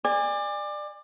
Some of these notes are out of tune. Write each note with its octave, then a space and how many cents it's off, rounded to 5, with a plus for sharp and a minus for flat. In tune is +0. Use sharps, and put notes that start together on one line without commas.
D5 +25 G#5 -30